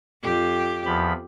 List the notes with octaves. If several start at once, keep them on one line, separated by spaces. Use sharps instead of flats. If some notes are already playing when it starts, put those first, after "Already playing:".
F2 G4
E2 F3 B5